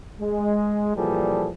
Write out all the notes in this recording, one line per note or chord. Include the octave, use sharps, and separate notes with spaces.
G#3
A#2 E3 F3 G3 G#4 A4